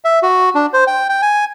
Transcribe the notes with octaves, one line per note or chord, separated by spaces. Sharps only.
E5
F#4
D4
C5
G5
G5
G#5